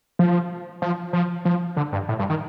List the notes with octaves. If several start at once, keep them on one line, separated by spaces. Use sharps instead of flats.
F3
F3
F3
F3
D3
G2
A2
G2
D#3